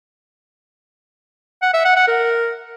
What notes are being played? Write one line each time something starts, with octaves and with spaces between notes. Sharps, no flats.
F#5
E5
F#5
F#5
A#4